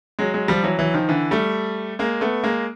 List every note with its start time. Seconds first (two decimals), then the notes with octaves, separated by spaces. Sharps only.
0.19 F#3 G#3
0.33 F#3 G#3
0.48 F3 G3
0.64 E3 F#3
0.79 E3 F#3
0.94 D#3 F3
1.09 D3 E3
1.31 G3 A3
1.99 G#3 A#3
2.21 A3 B3
2.44 G#3 A#3